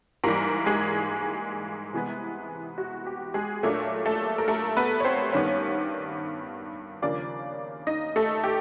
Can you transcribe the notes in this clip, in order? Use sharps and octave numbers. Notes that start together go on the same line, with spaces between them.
G#2 E3 G3 A#3 A#4
G#3 G#4
C3 E3 G#3 B3
F#4
G4
G#3 G#4
A#2 F#3 A3 A#3 D4 A4
A3 A4
A#4
A3 A4
B3 B4
C#5
C4 C5
G2 D#3 G3 B3 C#4 C#5
D#2 C#3 F3 A#3 D4 D5
D#4 D#5
A3 A4
G4